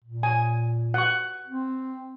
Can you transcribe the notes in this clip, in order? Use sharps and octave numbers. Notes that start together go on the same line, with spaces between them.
A#2
G#5
F#5 C#6
C4